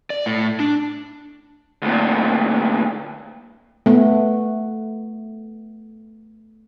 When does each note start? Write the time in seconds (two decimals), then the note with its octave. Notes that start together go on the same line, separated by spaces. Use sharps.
0.10 D5
0.26 A2
0.60 D4
1.82 D2 A#2
3.86 A3 B3